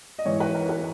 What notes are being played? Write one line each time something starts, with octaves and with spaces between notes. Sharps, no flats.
D#5
G#2 E3 C#5
B4
A#4
B4